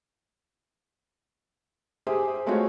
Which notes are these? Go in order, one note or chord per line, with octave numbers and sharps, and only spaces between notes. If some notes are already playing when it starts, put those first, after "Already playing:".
G4 G#4 C5 E5
G#3 A3 C4 F4 F#4 C#5